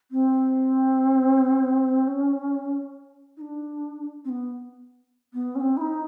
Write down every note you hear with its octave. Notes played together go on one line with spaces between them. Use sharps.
C4
C#4
D#4
D4
C4
B3
B3
C#4
C4
E4
D#4